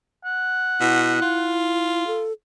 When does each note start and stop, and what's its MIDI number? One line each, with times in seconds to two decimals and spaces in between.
0.25 1.56 78
0.80 1.17 47
0.80 2.06 64
1.22 2.26 65
2.07 2.33 69